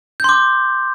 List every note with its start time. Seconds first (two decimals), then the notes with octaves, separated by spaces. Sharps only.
0.20 G6
0.24 C6
0.29 D6